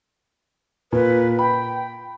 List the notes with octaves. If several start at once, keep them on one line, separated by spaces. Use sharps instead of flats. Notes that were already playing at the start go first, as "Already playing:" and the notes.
A#2 B4
G5 B5